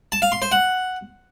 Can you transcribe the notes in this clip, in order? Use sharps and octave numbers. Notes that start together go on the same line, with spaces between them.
A5
F5
C6
C5
F#5